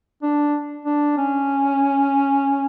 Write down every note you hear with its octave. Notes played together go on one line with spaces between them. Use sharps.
D4
D4
C#4